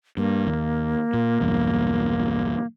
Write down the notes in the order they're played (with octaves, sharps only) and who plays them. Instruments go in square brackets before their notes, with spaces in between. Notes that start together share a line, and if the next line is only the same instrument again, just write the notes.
[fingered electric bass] G2 [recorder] A#3
[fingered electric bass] D#2
A#2
B1 E2 G2